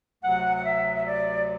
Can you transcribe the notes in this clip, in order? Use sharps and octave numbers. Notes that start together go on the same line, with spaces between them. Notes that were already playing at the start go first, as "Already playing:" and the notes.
D2 C3 F#3 F#5
F#5
E5
E5
D5